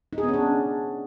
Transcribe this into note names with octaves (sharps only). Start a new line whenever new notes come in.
D#4
G#4
B3
C#4
D4